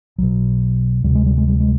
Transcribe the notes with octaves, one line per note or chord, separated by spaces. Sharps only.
B1 B2 F#3
D2 C3 G3
G#3
G3
G#3
G3
G#3